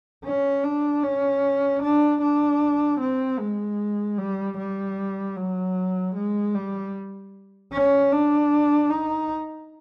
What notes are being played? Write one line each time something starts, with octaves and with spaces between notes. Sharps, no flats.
C#4
D4
C#4
D4
D4
C4
G#3
G3
G3
F#3
G#3
G3
C#4
D4
D#4